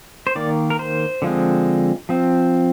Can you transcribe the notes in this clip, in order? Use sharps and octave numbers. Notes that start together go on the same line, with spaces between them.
C5
D#3 A#3 D5
A#4
C5
D3 F3 G#3 C4
F3 C4